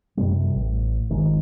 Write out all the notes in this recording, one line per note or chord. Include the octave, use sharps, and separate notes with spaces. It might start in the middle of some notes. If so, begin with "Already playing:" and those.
F#2 C3 G3
A1
G1 C#2 D#3 G#3